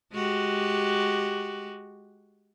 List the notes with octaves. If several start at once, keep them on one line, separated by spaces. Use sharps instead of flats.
G#3 F#4 G4